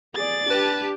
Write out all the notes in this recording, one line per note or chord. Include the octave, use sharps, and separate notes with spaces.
G#4 D5 A6
D4 G4 B4 A5